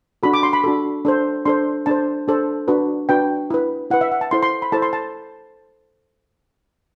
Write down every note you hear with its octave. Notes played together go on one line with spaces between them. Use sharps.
D4 F#4 A4 B5
D6
C6
B5
D4 F#4 A4
D4 A4 C5
D4 A4 C5 C6
D4 A4 C5 A5
D4 A4 C5
D4 F#4 B4
D4 F#4 B4 G5
E4 B4
E4 B4 F#5
E5
F#5
A5
E4 A4 C5 C6
C6
B5
E4 A4 C5 A5
C6
A5